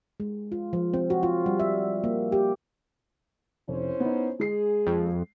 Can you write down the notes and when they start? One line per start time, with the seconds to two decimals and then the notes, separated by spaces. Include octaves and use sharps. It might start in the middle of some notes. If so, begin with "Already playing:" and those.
0.20 G#3
0.52 F4
0.73 F3
0.94 C4
1.10 F#4
1.23 F4
1.46 G3
1.60 E5
2.04 A#3
2.32 G4
3.68 F1 C#4 E4 C5
4.00 B3 D#4
4.40 G#3 G#4 C7
4.87 F2